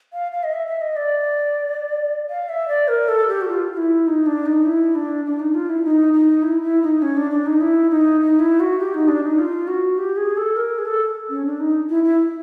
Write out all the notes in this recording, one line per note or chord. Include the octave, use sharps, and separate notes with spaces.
F5
F5
D#5
E5
E5
D#5
D5
F5
E5
D5
A#4
A4
G4
F#4
F4
F4
E4
D#4
D4
D#4
E4
D4
D4
D#4
F4
E4
D#4
D#4
E4
E4
D#4
C#4
D4
D4
D#4
E4
D#4
D#4
E4
F#4
G4
D#4
D4
D#4
F4
F#4
G4
G#4
A4
A#4
G#4
A4
C#4
D4
D#4
E4
E4